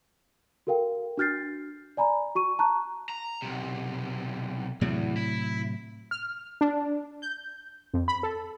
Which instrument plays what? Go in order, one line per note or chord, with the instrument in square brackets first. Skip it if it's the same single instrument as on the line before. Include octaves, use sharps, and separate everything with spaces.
[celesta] F#4 A4 A#4 F5 G5
D4 F#4 F6 G6 A6 C7
D5 G#5 A#5 B5
F#4 C#6 D#7
A5 A#5 C#6 F#6
[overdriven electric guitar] A#5
B1 C3
[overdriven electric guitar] E2 [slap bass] A2 C3 F#3
[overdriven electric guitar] E4
[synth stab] F6
D4
G6
F2
B5
A4